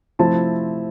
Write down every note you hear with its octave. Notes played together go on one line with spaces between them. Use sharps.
C3 F3 A3 C4 E4 A5